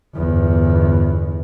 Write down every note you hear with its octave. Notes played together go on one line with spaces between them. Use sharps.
G1 E2